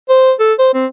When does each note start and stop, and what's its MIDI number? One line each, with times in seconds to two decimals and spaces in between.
0.09 0.32 72
0.40 0.53 69
0.59 0.69 72
0.74 0.86 60